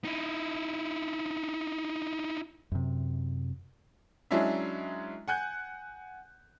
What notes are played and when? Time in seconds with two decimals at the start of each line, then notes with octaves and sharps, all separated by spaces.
0.05 D#4 E4
2.72 F#2 C3
4.31 F#3 G#3 C#4 D4 E4 E5
5.28 F#5 G#5 F#6 G6